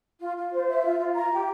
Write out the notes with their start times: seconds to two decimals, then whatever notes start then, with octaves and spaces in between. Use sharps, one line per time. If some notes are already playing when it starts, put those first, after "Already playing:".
0.21 F4
0.37 F4
0.52 C5
0.69 E5
0.85 F4
1.00 F4
1.16 A#5
1.32 G4